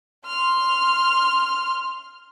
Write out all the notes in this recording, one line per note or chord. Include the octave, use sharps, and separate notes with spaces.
C6 F6